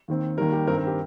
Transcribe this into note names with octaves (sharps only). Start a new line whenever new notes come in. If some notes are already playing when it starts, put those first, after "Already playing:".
D#2 D#3 C4
D#2 D#3 G3 A#4
G4
G2 D#3 C4 A#4
A#4
G4